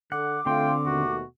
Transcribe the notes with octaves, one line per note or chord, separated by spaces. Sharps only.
D3 F#5 D6
D3 A3 C4 F4 G5 C6
D#2 B2 A3 F#4